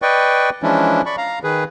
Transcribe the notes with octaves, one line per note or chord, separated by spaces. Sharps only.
B4 D5 D#5 G5 C#6
E3 F3 G#3 C#4 D4 E4
D5 B5 C#6
F5 A#5
D#3 G#4 B4